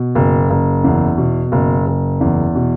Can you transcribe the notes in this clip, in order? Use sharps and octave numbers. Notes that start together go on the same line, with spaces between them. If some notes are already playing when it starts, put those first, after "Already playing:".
Already playing: B2
F#1
F#1
E2
B2
F#1
F#1
E2
B2